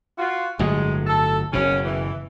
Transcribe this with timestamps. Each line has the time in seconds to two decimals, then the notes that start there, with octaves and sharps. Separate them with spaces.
0.19 F4 F#4
0.59 G1 A2 F#3 G#3
1.07 A4
1.53 F#1 B2 C#4
1.85 E3